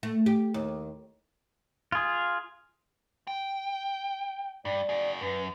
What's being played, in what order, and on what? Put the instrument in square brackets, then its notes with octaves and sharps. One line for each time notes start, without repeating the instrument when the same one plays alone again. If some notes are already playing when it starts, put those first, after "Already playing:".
[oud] A3
G4
D#2
[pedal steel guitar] F4 G#4
[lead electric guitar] G5
[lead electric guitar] G2 [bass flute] D5
[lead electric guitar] F#4 G#4
[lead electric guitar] F#2 [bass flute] B4